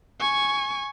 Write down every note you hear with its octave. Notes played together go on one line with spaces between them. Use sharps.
G#5 C#6